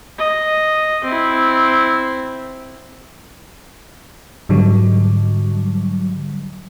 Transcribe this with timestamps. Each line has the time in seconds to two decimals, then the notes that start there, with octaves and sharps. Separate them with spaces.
0.18 D#5
1.04 C4 E4
4.49 G#2 D3 F#3 G3